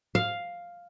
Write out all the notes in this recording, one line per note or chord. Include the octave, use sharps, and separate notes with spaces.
F5